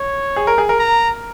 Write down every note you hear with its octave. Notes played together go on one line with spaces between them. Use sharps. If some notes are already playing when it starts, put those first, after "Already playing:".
Already playing: C#5
G#4
A#4
G#4
A#4
A#5